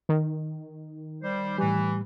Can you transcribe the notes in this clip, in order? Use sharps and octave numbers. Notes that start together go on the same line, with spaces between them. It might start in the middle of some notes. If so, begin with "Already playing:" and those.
D#3
G3 C5
A2 E3 G3